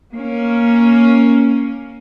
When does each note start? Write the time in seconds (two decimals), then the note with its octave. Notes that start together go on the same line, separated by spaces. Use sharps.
0.14 A#3 C#4